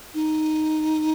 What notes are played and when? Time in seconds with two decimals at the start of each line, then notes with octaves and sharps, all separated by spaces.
0.14 D#4